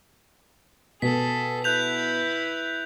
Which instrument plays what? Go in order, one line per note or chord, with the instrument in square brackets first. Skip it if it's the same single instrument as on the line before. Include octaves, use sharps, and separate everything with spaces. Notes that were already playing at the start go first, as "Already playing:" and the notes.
[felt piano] B2 [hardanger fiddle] G#4 A4 [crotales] B6
[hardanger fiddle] E4 B4 [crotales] F#6 G6 F7